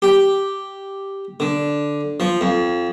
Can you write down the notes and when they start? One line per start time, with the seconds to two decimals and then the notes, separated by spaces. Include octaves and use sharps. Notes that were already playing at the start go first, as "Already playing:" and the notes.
0.02 G4
1.40 D3
2.20 F3
2.41 F2